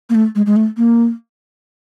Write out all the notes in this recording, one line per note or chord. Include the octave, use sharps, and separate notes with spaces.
A#3
A3
G#3
G#3
A3
A#3